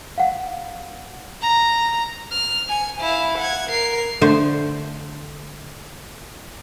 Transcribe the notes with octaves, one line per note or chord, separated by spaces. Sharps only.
F5 F#5
A#5
F6
G#5 C#7
E4 F5
F#5 G#6
A#4 C7
D3 A3 C5